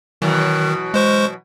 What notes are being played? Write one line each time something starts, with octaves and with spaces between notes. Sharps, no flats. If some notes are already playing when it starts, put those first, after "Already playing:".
B2 D#3 E3 F#3
G#3 C5 C#6